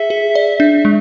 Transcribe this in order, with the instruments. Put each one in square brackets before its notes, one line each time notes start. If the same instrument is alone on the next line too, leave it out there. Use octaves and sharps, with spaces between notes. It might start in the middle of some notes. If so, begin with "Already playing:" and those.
Already playing: [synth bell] G#4 [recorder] E5
[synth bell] G#4
D5
D4
G#3